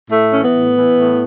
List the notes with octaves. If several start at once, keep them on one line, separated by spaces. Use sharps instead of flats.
A2 A3
E3 C#4
B3
A2
E3
A2